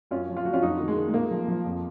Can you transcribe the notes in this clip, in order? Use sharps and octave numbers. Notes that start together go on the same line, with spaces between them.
F#2 C#4 F4
F3
F4
F3 F#4
C#4 F4
F2 D#4 F#4
D#3
G#3
D#3
G#3
A#2 A#3
F3
F3
F2